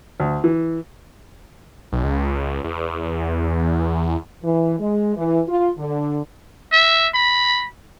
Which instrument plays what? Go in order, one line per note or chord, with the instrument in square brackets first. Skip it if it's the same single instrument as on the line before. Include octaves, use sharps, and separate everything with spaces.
[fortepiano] D2
E3
[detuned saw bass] B1
C#2
E2
[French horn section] E3
G#3
E3
F4
D3
[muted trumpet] E5
B5